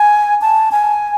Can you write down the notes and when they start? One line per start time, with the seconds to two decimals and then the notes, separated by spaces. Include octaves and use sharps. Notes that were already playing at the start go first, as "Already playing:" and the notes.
Already playing: G#5
0.41 A5
0.72 G#5